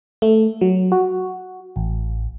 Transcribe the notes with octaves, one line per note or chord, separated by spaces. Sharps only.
A3
F#3
F#4
A1